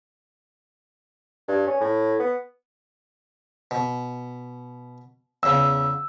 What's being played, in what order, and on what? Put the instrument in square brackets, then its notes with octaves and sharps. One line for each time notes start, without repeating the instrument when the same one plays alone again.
[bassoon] G2
C#4
A2
B3
[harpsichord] B2
[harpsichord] E2 C#3 [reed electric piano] E6